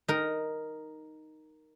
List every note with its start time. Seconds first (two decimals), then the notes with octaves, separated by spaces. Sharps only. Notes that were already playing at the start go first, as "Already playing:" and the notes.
0.08 D#4 A#4